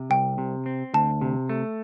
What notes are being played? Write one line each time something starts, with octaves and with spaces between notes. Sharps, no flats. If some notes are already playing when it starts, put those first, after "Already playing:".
Already playing: C3
C2 G5
C3
C4
D2 A5
C3
A3